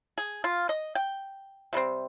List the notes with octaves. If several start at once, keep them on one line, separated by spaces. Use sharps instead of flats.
G#4
F4
D#5
G5
C3 G3 C4